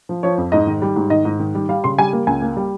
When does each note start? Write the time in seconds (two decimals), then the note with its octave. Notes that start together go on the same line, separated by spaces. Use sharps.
0.09 F3
0.23 F3 C#5
0.38 F2
0.52 G#2 D#5
0.67 D#3
0.82 G3
0.96 G#2
1.10 D#3 D#5
1.25 G#2
1.40 D#3
1.55 G3
1.69 G3 F5
1.84 C#3 C6
1.98 G3 G#5
2.13 A#3
2.27 C#2 G#5
2.42 A#3
2.57 G3